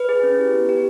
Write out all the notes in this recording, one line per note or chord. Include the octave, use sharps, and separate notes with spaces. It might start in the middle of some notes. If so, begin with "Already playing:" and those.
Already playing: B4
G#4
C#4
E4 G4
B3
G4